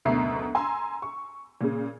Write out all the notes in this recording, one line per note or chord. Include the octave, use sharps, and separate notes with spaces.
F#1 D2 B2 E5 A#5 C7
G#5 A#5 C6 E6
C#6
A#2 C#3